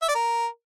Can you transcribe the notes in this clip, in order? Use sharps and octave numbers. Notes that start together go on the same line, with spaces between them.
E5
D5
A#4